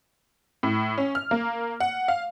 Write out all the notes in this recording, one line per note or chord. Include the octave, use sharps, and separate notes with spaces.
A2
C#4
F6
A#3
F#5
F5